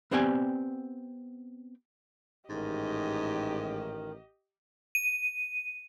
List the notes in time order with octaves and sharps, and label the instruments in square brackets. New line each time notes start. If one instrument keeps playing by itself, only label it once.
[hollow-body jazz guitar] B3 C4 G4 D5 G#5
[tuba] A1 [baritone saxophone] G#2 [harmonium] D#3 [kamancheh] G4 D#5
[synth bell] D#7